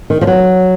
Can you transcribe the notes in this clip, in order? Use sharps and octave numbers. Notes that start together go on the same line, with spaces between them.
D#3
F3
F#3